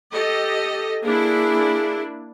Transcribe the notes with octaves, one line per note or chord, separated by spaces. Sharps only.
G4 A4 D#5
A#3 D4 E4 G#4